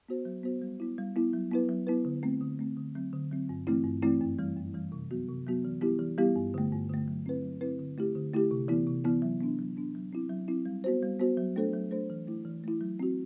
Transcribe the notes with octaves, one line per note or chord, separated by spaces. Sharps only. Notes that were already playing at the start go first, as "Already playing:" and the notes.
B3 F#4 C5
F#3
B3 F#4 C5
G3
B3 E4
G3
B3 E4
F#3
B3 E4 B4
F#3
B3 E4 B4
D3
A3 C4
D3
A3 C4
D3
F#3 C4
D3
F#3 C4
G2
E3 A3 C4 E4
G2
E3 A3 C4 E4
F#2
E3 G3
F#2
E3 G3
C3
F#3 B3 F#4
C3
F#3 B3 F#4
E3
G3 B3 E4 G4
E3
G3 B3 E4 G4
G2
D3 A3
G2
D3 A3
F#3
C4 E4 B4
F#3
C4 E4 B4
D3
A3 E4 G4
D3
A3 E4 G4
C3
E3 B3 E4
C3
E3 B3 E4
F#3
B3 D4
F#3
B3 D4
F#3
C4 E4
F#3
C4 E4
G3
B3 F#4 C5
G3
B3 F#4 C5
F#3
A3 D4 A4 C5
F#3
A3 D4 A4 C5
E3
A3 E4
E3
A3 E4
F#3
C4 F#4